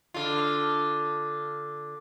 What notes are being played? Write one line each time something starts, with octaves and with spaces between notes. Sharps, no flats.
D3 F4